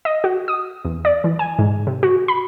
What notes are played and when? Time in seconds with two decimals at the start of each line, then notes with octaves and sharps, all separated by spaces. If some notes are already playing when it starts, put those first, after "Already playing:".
0.05 D#5
0.24 F#4
0.48 D#6
0.85 E2
1.05 D5
1.24 E3
1.39 G#5
1.59 G#2
1.87 C3
2.03 F#4
2.28 B5